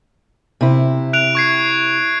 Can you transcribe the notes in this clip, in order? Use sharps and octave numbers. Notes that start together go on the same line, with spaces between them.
C3 E4
F#6 D7 F7
C#6 G#6 C7